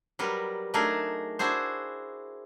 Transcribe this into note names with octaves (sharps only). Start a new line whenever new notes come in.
F#3 G3 A#4 B4
F#3 A3 D4 D#4 G#4 A#4
D4 E4 F#4 G#4 C5